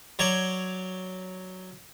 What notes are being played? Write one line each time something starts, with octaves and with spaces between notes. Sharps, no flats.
F#3 C#5 D5